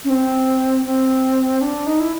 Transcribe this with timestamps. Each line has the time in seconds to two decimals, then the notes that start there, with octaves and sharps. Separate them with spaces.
0.04 C#4
0.10 C4
0.85 C4
1.61 D4
1.87 D#4
2.00 E4